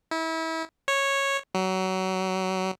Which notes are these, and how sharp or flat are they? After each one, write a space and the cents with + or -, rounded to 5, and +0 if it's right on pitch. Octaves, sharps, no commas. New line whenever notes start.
E4 -30
C#5 -10
F#3 +25